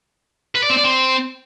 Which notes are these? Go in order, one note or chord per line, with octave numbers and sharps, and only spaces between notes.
B4
D5
C4
D5
C4